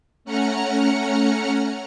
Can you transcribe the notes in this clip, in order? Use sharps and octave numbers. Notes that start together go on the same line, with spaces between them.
A3 C#4 F#5 A#5 F6 C#7